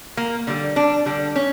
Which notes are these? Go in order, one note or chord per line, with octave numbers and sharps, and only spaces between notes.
A#3
D3 G3
D4
D3 G3
C#4